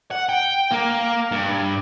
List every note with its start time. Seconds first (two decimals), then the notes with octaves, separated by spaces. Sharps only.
0.11 F#5
0.29 G5
0.72 A#3
1.32 G2